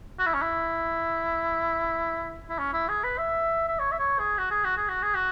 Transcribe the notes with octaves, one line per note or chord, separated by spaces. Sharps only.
F#4
E4
C#4
E4
E4
C#4
E4
G#4
B4
E5
E5
C#5
E5
C#5
G#4
F#4
G#4
F#4
G#4
F#4
G#4
F#4